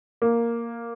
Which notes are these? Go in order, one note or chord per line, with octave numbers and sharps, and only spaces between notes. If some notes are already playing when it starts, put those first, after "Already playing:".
A#3